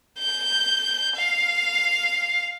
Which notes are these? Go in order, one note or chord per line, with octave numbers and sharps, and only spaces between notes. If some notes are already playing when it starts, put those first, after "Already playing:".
G6
F5